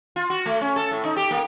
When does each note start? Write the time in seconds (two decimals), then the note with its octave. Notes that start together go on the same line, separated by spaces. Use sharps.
0.16 F4
0.30 F#4
0.46 A3
0.61 C#4
0.76 A4
0.91 A2
1.05 D#4
1.17 G4
1.31 A#3